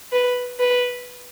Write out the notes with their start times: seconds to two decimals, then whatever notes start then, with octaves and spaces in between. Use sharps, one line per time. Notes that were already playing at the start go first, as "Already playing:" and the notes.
0.11 B4
0.59 B4